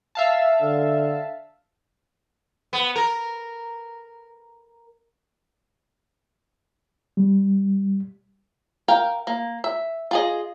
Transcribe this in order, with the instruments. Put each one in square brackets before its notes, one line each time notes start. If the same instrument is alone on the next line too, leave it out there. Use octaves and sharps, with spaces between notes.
[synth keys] E5 F5 A5
[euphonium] D3
[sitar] B3
A#4
[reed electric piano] G3
[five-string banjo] A#4 F5 G5
A#3
E5
F4 G#4 D#5